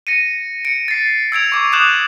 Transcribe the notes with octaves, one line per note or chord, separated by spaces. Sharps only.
A#6 C#7 D#7
C#7 D7
A6 C7
E6 G#6 D7 F7
C#6 D6
D6 D#6 F#6 G6 E7 F#7